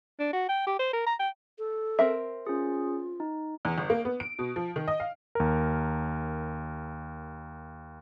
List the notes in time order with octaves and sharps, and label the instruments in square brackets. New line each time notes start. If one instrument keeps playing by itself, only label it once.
[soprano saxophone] D4
F#4
G5
G4
C5
A#4
A#5
G5
[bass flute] A4
[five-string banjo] C4 A#4 E5
[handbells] C#4 G#4 [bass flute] F4
[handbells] D#4
[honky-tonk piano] E2
G1
A#3
B3
D7
B2
F3
D#3
D#5
F5
[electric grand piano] D#2 A#4